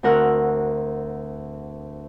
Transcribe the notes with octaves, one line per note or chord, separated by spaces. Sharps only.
D2 C4 A#4 F#5 E6 F6